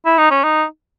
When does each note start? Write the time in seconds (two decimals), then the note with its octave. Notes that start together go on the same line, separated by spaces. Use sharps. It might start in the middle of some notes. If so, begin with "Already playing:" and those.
0.06 E4
0.18 D#4
0.31 C#4
0.43 D#4